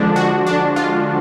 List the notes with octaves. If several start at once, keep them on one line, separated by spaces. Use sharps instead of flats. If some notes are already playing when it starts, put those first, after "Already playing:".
Already playing: D3 F3 G#3 D4
F#4
D4
F4